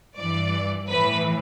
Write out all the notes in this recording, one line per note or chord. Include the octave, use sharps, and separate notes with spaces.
G2 E3 D5
A2 E3 B4